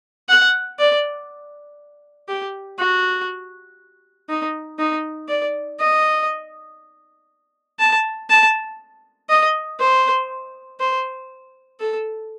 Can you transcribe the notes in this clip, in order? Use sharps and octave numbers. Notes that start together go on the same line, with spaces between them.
F#5
D5
G4
F#4
D#4
D#4
D5
D#5
A5
A5
D#5
C5
C5
A4